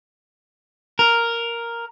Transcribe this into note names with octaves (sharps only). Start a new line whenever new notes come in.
A#4